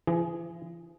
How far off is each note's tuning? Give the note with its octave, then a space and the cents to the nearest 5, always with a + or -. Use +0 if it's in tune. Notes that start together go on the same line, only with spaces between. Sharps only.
E3 +45 G#4 +0